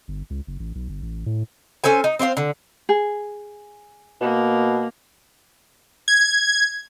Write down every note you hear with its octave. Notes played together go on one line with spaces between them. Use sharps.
G1
C#2
F#1
A1
B1
G1
A1
A2
C#4 A4 C5 G#5
D#4
C4 C5 C#5 F5
D3
G#4
B2 A#3
G#6